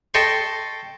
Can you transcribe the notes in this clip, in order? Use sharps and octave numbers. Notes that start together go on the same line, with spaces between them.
A4 D#5 G5 C6 C#6